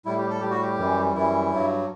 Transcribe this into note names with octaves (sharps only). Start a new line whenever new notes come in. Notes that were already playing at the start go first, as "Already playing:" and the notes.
A2 G3 E4
G4
A4
A2 G3 G4
F#4
G4
F#2 E3 G3
F#2 E3 G3 E4
G2 F#3